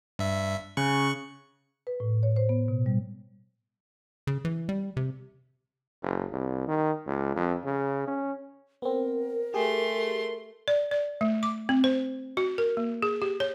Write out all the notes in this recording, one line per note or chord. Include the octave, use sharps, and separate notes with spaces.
G2 E5
C#3 C#6 F#6
B4
A2
C#5
C5
B3
B2
G3
C#3
E3
G3
C3
F#1
C2
D#3
C#2
F2
C#3
C#4
B3 C4 A#4
A3 G4 G#4 C6
D5
D5
A3
D6
C4
C5
F#4
A#4
A#3
G#4
G4
C#5